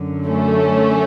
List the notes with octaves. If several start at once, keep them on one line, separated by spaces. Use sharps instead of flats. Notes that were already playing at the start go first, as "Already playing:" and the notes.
Already playing: F#2 D3
A3 C#4